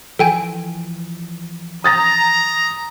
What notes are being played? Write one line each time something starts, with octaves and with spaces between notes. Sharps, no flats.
E3 F3 A4 G5 G#5
A#5 D#6 A6 A#6